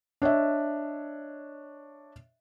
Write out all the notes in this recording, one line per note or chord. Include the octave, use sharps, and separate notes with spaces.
D4 C#5 D#5 E5